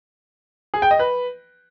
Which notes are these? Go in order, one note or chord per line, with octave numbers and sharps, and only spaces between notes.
G#4
G5
D#5
B4